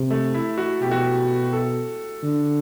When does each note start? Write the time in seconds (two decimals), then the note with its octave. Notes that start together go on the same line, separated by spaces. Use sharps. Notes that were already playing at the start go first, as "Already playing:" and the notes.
Already playing: C3
0.11 A3
0.34 E4
0.58 F#4
0.81 B2 G4
0.91 F#4
1.01 G4
1.53 A4
2.23 D3